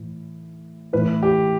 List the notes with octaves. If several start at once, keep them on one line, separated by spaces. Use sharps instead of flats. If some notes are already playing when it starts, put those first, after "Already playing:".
Already playing: A2 E3
A2 E3 B4
G4